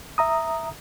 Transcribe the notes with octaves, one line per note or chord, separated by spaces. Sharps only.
E5 A#5 D#6